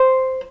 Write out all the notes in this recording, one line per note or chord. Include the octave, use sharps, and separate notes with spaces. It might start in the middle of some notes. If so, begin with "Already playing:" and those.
Already playing: C5